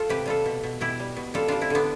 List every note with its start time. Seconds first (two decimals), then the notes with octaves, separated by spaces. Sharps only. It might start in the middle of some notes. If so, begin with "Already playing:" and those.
Already playing: A3 F4 A4
0.09 C3 G4 B4
0.26 G3 F4 A4
0.46 B2
0.63 B2
0.81 B2 E4 G4
1.00 G3
1.17 B2
1.34 G3 F4 A4
1.48 G3 D4 F4
1.61 C4 E4
1.70 D3 B3 D4